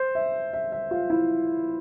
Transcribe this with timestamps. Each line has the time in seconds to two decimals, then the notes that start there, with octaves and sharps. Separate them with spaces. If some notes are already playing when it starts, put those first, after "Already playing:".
Already playing: C5
0.15 E5
0.53 E5
0.72 E5
0.91 F4
1.10 E4